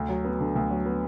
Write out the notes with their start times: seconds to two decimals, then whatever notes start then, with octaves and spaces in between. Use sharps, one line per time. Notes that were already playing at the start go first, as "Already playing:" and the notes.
Already playing: D2
0.09 F#3
0.24 B3
0.40 D3
0.56 D2
0.70 F#3
0.86 B3